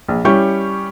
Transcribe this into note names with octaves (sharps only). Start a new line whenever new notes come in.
A#1
G3 C#4 E4 G4 C#6 G6